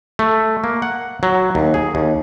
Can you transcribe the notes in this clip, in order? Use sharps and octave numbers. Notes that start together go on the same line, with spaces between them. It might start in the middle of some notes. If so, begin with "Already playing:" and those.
A3
A#3
F#5
F#3
D#2
G#4
D#2